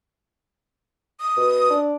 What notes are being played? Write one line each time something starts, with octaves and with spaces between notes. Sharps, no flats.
D#6
B2
D4